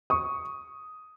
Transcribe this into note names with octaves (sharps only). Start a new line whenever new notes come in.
C#6 D#6